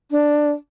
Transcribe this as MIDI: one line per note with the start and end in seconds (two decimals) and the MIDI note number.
0.11 0.49 62